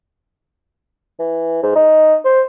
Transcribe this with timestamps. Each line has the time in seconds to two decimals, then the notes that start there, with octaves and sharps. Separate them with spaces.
1.19 E3
1.63 G#2
1.76 D#4
2.25 C5